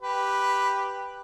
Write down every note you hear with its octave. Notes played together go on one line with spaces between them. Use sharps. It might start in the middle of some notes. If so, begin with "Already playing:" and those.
G4 B4